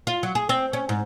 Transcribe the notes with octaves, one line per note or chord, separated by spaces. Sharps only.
F4
F#3
G#4
C4
C#4
G#2